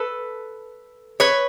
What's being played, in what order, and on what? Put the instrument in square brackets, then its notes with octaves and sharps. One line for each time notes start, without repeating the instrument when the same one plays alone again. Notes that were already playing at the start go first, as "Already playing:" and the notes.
Already playing: [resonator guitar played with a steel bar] A4 B4
B4 C#5